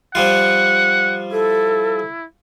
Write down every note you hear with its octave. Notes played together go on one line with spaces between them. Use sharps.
F3 G3 F4 F#5
E4 A4